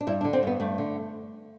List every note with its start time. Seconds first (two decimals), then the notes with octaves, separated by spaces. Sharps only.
0.01 D4
0.07 G2 E4
0.21 D4
0.25 D3
0.33 C4
0.43 G2 B3
0.60 G2 A3
0.78 D3